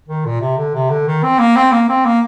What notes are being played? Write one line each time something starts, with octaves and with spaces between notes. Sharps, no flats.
D#3
A#2
C3
D3
C3
D3
D#3
C4
A#3
C4
A#3
C4
A#3